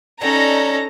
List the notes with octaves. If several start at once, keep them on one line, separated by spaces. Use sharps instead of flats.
F#3 G3 A3 C#4 D#4 A4 A#5